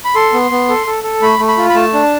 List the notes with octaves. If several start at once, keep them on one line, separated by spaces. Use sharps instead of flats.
B5
A4 C6
B3
B3
A4
A4
A4
A3 B5
A3
B5
F4
B5
A3 A5
D4